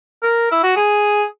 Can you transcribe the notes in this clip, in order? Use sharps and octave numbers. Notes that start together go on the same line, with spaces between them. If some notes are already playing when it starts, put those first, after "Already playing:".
A#4
E4
F#4
G#4